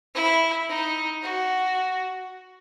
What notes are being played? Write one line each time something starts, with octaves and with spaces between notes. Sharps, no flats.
E4
D#4
F#4